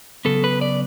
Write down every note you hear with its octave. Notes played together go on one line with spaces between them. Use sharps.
C#3 F#3 B3 A4
B4
D5